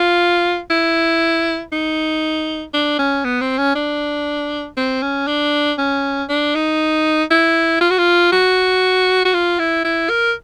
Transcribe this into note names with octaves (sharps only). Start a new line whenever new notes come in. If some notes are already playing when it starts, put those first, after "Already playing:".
Already playing: F4
E4
D#4
D4
C#4
B3
C4
C#4
D4
C4
C#4
D4
C#4
D4
D#4
E4
F4
F#4
F4
F#4
F#4
F4
E4
E4
A#4